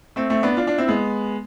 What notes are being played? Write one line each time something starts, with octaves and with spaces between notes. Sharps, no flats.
A3 C4
A3 C4
B3 D4
D4 F4
D4 F4
C4 E4
G#3 B3